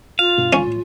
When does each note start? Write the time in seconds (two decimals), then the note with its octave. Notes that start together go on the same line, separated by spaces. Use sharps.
0.19 F4 F5
0.37 G2 B2 D4
0.53 D2 C#4
0.67 A2